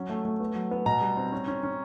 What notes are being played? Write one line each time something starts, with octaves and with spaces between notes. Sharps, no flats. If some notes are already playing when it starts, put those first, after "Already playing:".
Already playing: F#3 C#4
A3
A3
B3
F#3
B3
B2 A#5
G3
C4
C#4
C#4
C#4